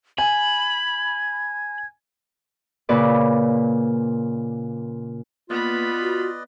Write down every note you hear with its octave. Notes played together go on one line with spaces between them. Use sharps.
G#5 B5 G#6
A#2 C#3 C#4 B4 D5
A#3 B3 F4 B4 D5 D#5 B5
F#4